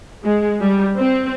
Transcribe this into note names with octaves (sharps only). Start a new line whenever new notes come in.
G#3
G3
C4